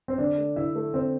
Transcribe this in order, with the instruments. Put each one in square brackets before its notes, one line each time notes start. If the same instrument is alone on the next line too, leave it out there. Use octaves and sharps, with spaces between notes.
[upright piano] C4
[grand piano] D3 [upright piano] D4
[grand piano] A3
[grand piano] D3 [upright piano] E4
[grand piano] A3
[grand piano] D3 [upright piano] C4